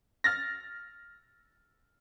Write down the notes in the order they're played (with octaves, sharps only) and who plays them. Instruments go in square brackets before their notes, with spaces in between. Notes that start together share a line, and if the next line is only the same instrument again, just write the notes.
[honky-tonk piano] F6 A6 A#6